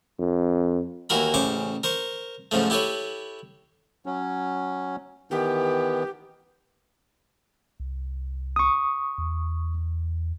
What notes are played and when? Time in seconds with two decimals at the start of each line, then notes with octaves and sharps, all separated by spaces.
0.19 F2
1.09 D#2 E3 F#4 A#4 B5
1.34 A1 C#3 C5 C#6 D6
1.83 A#4 C5 C#6
2.51 G#2 C#3 F3 A3
2.70 E4 G4 A4 B4 C#5
4.06 F#3 C#4
5.31 D#3 E3 B3 G4
7.80 C2
8.56 C#6 D#6
9.18 E2